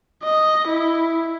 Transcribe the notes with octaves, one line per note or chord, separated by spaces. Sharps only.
D#5
E4